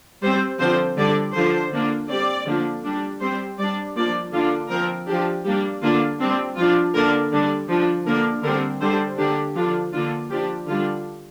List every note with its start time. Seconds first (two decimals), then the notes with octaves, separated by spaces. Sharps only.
0.23 G3 C4 C5
0.60 D3 F3 C4 C5
0.97 D3 G3 D4 D5
1.35 D3 F3 D4 C5
1.72 D3 A#3 D4
2.09 G3 C4 D5
2.46 D3 F3 A#3 D4
2.84 G3 D4
3.21 G3 C4 C5
3.59 G3 D4 D5
3.96 F3 A#3 D4 D5
4.33 D3 A#3 D4 F4
4.70 F3 C4 A#4
5.07 F3 D4 G4
5.45 G3 A#3 D4 G4
5.82 D3 A#3 D4 F4
6.20 G3 C4 D4
6.57 F3 D4 F4
6.94 D3 A#3 D4 A#4
7.32 D3 G3 D4
7.69 F3 D4
8.06 D3 A#3 D4 A#4
8.43 D3 G3 C4 A#4
8.81 D3 G3 D4 C5
9.18 D3 A#3 D4 G4
9.55 D3 F3 D4 F4
9.93 D3 A#3 D4 F4
10.30 F3 D4 G4
10.67 D3 G3 D4 F4